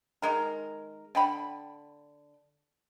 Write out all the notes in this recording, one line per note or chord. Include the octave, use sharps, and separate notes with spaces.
D#3 G#3 A#4
D3 G5 B5